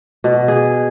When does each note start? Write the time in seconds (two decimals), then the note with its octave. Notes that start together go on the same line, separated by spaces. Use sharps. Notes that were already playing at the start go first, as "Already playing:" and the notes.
0.24 B2
0.48 G#4